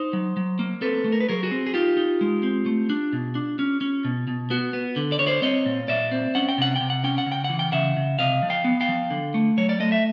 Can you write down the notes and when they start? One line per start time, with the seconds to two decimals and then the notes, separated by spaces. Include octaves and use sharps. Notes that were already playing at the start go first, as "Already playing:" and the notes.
Already playing: D#4 C5
0.13 F#3
0.37 F#3
0.59 A#3
0.81 C4 A4 B4
1.05 A3
1.12 A#4
1.20 B4
1.29 F#3 G#4 A#4
1.43 F#4 G#4
1.51 C4
1.66 G#4
1.74 D#4 F4 G4
1.97 D#4
2.21 G#3
2.43 C4
2.66 A3
2.90 D4
3.13 B2
3.35 D4
3.59 C#4
3.81 C#4
4.05 B2
4.28 B2
4.50 B3 F#4
4.73 B3
4.96 D3
5.12 D5
5.19 D3 C#5
5.27 C5 D5
5.42 C4 C#5 D#5
5.66 A#2
5.88 A#2 D5 E5
6.11 C4
6.35 C#4 F#5
6.49 G5
6.58 C3 F#5
6.76 C3 G5
6.90 F#5
7.04 C#4 G5
7.18 F#5
7.26 C#3
7.32 G5
7.44 F#5
7.50 E3
7.59 G5
7.72 C#3 E5 F#5
7.97 C#3
8.19 C3 D#5 F5
8.43 F3
8.50 F5 G5
8.64 B3
8.81 F5 G5
8.89 F3
9.10 D3
9.34 A3
9.58 F#3 C#5
9.69 D5
9.80 A3 D#5
9.92 E5